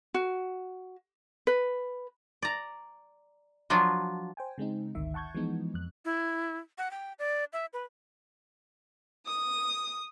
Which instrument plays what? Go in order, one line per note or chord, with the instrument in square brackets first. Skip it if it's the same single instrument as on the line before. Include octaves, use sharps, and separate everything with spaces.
[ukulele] F#4
B4
[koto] D5 A#5
F3 F#3 D4 F4
[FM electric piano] C5 G5 G#5
C#3 G#3 C4 D#4
G#1 D2 D#3 E5
F#5 A5 C#6 G6 G#6
E3 F3 G#3 B3 D#4
F2 F#6
[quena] E4
F#5
G5
D5
E5
B4
[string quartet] D#6